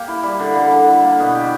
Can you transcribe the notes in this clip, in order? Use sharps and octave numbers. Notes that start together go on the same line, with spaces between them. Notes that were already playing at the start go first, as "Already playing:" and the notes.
Already playing: A#3 G4
E4
G3
D3
D3
D3
E4
A#3
B2
G4